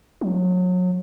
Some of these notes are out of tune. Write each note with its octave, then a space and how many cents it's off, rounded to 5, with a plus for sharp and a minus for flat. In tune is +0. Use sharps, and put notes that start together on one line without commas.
F#3 -30